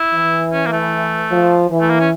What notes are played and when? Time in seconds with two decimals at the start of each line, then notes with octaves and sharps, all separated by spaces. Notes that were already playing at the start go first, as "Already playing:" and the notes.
Already playing: E4
0.14 E3
0.53 C#4
0.66 A#3
0.73 A3
1.31 F3
1.71 E3
1.81 A3
1.90 A#3
2.00 C#4